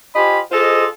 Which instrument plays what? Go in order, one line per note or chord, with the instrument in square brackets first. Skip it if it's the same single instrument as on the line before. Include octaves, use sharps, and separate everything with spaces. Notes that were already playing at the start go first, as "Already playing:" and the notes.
[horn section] F4 G4 C5 D#5 G#5 B5
F4 G#4 A4 C5 D#5